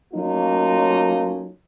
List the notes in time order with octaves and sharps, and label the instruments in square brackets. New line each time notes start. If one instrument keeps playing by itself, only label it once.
[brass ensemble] F#3 A3 A#3 C#4 D#4 F4